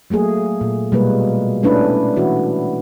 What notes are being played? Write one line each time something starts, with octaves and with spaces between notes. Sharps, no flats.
F#3 A3 A#3 G#4
A#2
B2 G3 G#3 A#3 B4
A3 C#4 D4 E4 B4
E3 E4 F#4